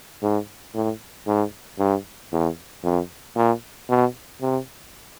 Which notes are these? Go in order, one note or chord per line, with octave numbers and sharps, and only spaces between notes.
G#2
A2
G#2
G2
E2
F2
A#2
B2
C3